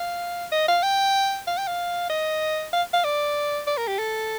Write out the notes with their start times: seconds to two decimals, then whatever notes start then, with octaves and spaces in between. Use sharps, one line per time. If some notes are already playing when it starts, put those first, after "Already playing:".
Already playing: F5
0.52 D#5
0.68 F5
0.83 G5
1.47 F5
1.58 G5
1.67 F5
2.10 D#5
2.73 F5
2.93 F5
3.04 D5
3.67 D5
3.77 A#4
3.87 G4
3.99 A4